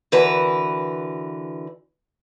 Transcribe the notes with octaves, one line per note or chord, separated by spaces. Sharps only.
D3 E3 F#4 A#4 B4